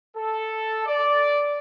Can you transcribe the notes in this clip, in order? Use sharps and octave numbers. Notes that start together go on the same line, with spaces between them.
A4
D5